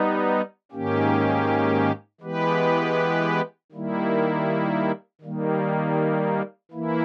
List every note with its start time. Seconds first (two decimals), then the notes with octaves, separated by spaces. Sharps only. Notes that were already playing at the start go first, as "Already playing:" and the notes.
Already playing: G3 B3 D#4
0.72 G#2 D#3 A#3 C#4 G4
2.21 E3 G#3 B3 G4 B4
3.72 D#3 G3 A#3 E4
5.21 D#3 G3 A#3
6.72 E3 A#3 E4